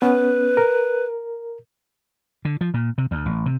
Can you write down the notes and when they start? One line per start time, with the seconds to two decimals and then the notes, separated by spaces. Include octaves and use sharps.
0.02 B3 C#4 B4
0.57 A#4
2.45 D3
2.61 F3
2.74 A#2
2.98 C3
3.11 D2
3.26 A1
3.46 C3